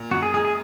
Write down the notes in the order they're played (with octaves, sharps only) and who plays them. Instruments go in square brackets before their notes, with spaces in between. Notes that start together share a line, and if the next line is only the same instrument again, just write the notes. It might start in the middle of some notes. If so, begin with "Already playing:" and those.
Already playing: [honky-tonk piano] A#2
[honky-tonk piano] F#2 [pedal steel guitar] F#4
[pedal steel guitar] G#4
[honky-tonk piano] G#3 [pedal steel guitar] G#4
[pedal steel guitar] G#4